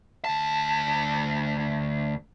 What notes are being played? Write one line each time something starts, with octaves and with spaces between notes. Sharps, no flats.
D2 A5